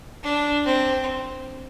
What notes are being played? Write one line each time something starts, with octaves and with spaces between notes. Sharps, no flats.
D4
C4